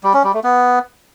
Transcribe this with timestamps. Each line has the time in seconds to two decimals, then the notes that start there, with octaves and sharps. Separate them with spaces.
0.04 G3
0.14 C#4
0.24 G3
0.34 A3
0.44 B3